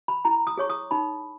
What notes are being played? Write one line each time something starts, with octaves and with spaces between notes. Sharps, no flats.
B5
E4 A#5
D#6
G#4 C#5 C#6
D#6
D#4 B5